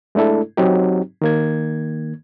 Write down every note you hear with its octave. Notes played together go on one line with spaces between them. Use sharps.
G#3 A3 D4 E4 A4
F#3 C4 D#4 G4
D#3 A#3 G#6